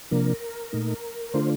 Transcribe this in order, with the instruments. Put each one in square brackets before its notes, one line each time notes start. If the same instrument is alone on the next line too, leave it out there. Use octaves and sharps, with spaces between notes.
[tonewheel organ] C3 F3 A#3 D4 A#4
A#2 A3 D#4
D3 A3 D4 F4 C5